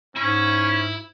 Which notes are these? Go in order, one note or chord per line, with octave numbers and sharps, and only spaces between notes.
G#2 C#4 E4